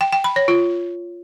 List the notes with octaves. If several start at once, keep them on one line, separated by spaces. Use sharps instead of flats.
G5
G5
B5
C#5
F4